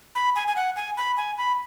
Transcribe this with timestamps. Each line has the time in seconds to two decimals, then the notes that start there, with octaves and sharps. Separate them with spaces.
0.15 B5
0.36 G#5
0.48 G#5
0.56 F#5
0.76 G#5
0.97 B5
1.17 G#5
1.38 B5